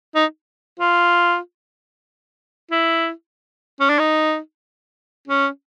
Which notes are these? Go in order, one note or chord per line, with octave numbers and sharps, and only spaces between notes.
D#4
F4
E4
C#4
D4
D#4
C#4